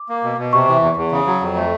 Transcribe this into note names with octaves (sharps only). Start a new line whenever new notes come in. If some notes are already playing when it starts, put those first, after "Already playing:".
Already playing: D6
A#3
B2
B2
C3 C#6
E3
E2
E2
C#3
F#3
F2
A3